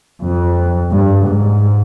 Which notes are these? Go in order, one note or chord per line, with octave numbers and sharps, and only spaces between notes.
F2
G2
G#2